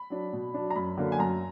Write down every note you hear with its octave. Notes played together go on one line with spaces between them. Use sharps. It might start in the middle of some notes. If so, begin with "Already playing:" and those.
Already playing: B5
F#3 D4
B2
F#3 D4
A#5
F#2 B5
D3 F#3 A#3
G#5
F#2 A#5